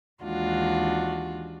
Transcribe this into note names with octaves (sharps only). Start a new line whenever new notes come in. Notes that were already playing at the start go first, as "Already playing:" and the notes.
D#2 E3 G#3 D4 F4 F#4